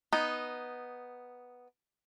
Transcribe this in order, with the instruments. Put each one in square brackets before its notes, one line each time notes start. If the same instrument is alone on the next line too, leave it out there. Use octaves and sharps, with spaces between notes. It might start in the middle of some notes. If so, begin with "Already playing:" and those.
[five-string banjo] B3 D#4